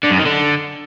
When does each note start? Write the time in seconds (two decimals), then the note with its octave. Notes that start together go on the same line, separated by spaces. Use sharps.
0.03 D3
0.10 F#2
0.18 D#3
0.25 D3